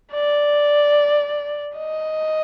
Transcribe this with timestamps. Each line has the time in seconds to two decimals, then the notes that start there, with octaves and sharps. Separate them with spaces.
0.13 D5
1.77 D#5